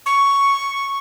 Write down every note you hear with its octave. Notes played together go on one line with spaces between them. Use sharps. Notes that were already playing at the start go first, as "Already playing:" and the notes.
C#6